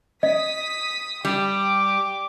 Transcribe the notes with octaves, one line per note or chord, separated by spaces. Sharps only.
D#5 D#6 B6
G3 G4 D6